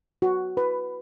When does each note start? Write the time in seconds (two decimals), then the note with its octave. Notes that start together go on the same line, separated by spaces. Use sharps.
0.22 F#4
0.57 B4